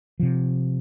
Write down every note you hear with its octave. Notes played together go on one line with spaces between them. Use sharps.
C3 F3